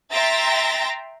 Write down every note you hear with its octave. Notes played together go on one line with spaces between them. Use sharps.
E5 G5 A#5 C6 A6 A#6